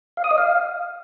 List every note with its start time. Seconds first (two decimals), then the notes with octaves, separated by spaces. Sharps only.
0.17 F5
0.24 D#6
0.31 D#5
0.38 F5